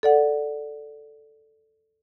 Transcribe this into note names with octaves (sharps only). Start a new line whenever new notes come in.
A4 D5 F#5